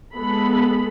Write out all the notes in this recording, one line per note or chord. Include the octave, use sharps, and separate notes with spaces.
G#3 B3 A4 B5